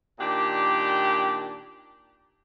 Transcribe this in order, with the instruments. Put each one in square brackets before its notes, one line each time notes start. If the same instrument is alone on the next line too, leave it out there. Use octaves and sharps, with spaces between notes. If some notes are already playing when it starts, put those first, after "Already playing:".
[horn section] A#2 D#3 D4 G4